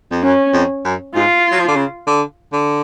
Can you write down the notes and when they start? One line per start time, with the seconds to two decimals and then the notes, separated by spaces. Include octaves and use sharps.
0.11 F2
0.23 F#2 C#4
0.53 F2
0.85 F#2
1.14 G#2 F4
1.51 F#3
1.59 F3
1.68 D3
1.76 C#3
2.07 D3
2.53 D3